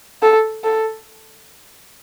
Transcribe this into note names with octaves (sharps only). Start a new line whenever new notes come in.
A4
A4